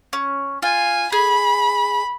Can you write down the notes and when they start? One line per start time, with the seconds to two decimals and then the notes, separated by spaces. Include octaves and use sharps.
0.13 C#4
0.62 F4 G#5
1.12 G#4 B5